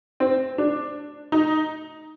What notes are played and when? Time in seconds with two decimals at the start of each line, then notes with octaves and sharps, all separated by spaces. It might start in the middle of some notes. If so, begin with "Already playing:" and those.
0.20 C4
0.58 D4
1.32 D#4